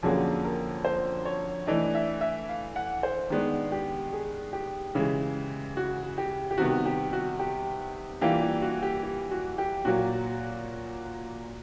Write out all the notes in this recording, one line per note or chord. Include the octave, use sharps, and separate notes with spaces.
F2 D3 F#3 A#3 C#4 G#4
A#4
C5
C#5
E3 A3 D4 D#5
E5
E5
F5
F#5
C5
D#3 G#3 B3 D4
G4
G#4
G4
C#3 E3 G#3
F#4
G4
G4
C3 D#3 G3 B3 F#4
G4
F#4
G4
E3 G3 A#3 D4 F4 G4
G4
F#4
G4
G4
F#4
G4
A#2 F#3 A#3 F#4